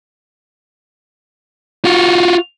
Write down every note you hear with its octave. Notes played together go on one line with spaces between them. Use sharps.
F4 F#4